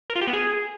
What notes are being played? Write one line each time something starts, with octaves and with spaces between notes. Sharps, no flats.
A#4
F4
G4
B3
G#4